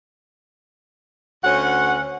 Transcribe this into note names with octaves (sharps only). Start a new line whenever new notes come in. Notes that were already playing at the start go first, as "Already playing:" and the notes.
D2 C#4 F#5